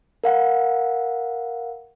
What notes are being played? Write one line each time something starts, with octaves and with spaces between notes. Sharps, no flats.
A#4 F5 F#5